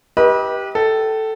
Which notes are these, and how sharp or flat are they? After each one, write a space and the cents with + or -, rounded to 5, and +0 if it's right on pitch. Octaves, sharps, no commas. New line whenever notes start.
G4 +0 B4 -30 D#5 +30
A4 +0 G5 -30